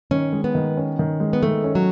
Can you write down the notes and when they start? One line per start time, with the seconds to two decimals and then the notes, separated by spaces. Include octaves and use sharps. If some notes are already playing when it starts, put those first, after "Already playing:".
0.11 D#3 C#4
0.33 G#3
0.44 B3
0.55 D#3
0.77 C#4
0.99 D#3
1.20 G#3
1.33 B3
1.43 D#3 A3
1.64 C#4
1.75 F#3